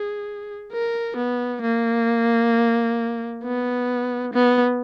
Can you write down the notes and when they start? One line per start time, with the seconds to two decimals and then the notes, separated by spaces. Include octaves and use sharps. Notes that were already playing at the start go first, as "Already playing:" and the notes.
Already playing: G#4
0.72 A#4
1.17 B3
1.62 A#3
3.44 B3
4.34 B3